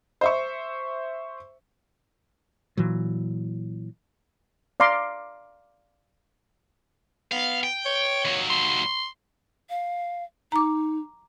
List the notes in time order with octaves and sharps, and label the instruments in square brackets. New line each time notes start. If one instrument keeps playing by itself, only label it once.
[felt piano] C5 E5 C#6
[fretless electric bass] A#2 E3 F#3
[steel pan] D5 F5 A#5 C6 D6
[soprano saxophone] B3 [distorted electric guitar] F5
[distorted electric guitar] G5
[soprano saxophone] C#5
[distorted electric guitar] D#2 F#3
[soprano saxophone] C6
[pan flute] F5
[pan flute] D#4 [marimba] A#5 D6